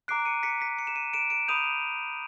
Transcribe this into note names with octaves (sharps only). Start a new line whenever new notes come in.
A#5 D6 F#6 C7 D7
C#7 D#7
B6 C#7
B6 C#7
B6 C#7
E7
C#7 D#7
D7 E7
D7 E7
B5 D#6 G6 D#7 F7